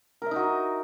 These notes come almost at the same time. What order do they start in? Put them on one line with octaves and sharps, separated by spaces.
A#4 E5 D#4 F#4